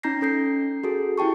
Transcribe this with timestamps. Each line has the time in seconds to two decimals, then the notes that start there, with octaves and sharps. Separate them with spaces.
0.03 C#4 D#4 A#5 G6 A#6 C7
0.21 C#4 A4 G6 C7
0.84 F#4 G#4 A4
1.18 E4 G4 G5 A5 C#6